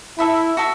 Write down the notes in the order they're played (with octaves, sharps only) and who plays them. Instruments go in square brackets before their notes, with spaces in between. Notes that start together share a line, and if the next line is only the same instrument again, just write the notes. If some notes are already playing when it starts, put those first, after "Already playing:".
[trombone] E4 [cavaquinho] A4 E5 B5
[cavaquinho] F#4 A4 E5